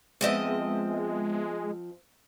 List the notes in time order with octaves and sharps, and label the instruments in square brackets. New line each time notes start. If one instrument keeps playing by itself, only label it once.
[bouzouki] F3 C4 D#5 [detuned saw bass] G#3 [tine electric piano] B3 E5